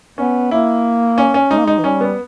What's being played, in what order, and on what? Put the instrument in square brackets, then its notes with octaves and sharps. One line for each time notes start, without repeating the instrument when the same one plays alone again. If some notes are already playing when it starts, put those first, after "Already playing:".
[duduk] B3 [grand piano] C#4
[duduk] A#3 [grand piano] E4
[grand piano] C#4
C#4
[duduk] G#3 [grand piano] D#4
[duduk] A#3
[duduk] G#3 [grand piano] D#4
[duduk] E3
[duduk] G3 [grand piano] C#4
[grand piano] B3